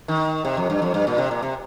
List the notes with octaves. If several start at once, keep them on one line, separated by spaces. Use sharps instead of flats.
D#3
C3
F2
G2
F2
G2
A#2
C3
A#2
C3